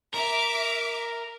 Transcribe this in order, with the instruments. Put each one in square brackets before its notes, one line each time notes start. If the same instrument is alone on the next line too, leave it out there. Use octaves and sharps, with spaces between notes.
[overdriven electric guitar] A#4 [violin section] E5 D6